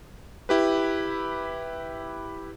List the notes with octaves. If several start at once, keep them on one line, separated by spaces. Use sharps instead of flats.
E4 G4 B4